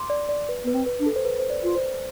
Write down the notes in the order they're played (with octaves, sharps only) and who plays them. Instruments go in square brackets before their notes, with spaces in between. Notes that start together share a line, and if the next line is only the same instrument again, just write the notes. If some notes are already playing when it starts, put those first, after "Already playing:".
Already playing: [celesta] C6 D6
D5
D5
B4
[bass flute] B3 [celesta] B4
[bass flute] C4
[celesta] B4
[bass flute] D4
[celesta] A4
C5
B4
C5
D5
[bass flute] F4
[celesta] C5